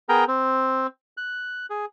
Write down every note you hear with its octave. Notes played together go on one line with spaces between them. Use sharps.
B3 G#4 A#4 G5 A#5
C4
F#6
G#4